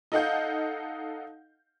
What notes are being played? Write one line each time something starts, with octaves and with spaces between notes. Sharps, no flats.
D#4 A4 D#5 F5 F#5 G6